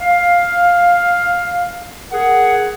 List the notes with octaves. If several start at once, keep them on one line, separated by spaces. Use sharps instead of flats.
F5
G#4 A#4 F#5